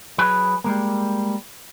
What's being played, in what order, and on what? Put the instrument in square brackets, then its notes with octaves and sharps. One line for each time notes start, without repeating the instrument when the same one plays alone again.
[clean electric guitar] F#3 G#4 B4
G3 G#3 A#3